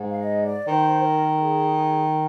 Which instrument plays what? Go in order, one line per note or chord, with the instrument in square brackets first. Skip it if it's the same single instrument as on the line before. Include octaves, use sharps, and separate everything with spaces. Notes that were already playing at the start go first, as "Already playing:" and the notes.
Already playing: [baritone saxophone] G#2
[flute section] F5
D#5
D5
[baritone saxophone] D#3 [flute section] C5
[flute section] A#4
G#4
A#4